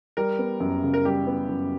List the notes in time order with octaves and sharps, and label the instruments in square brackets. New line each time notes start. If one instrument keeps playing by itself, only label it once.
[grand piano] G3 [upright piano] A#4
[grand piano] B3
F#2
C#3
[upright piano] A#4
[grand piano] G3 [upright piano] G4
[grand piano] B3
F#2